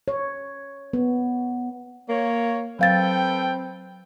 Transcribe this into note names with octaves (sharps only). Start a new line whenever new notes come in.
C#5
B3
A#3 C#5
F#3 C4 A4 B4 F5 G5 A6